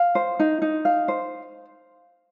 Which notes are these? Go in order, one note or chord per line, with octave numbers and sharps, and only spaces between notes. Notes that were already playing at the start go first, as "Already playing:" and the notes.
Already playing: F5
C5
D#4
D#4
F5
C5